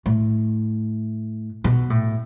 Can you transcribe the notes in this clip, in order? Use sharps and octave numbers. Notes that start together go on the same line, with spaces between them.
A2
B2
A2